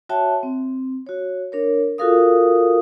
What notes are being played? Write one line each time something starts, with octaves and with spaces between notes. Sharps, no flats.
F#4 C#5 E5 G5 A5
C4
F#4 C#5
D4 A#4 C#5
F4 F#4 A4 A#4 F5 D#6